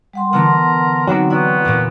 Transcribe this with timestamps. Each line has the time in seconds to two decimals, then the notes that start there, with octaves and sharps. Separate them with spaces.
0.13 G3 F#5 C6
0.33 D3 E3 B3 A#4 F#5 A5 C6
1.07 F#3 C4 D4 D#4 F#4
1.30 B3 E4 D5 A#5 C#6
1.65 E2 A#2